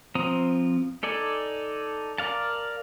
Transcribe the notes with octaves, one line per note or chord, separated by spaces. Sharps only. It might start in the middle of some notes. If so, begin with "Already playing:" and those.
F3 C4 A#5 D#6
D#4 A4 D5 G#5
A#4 D5 F5 A5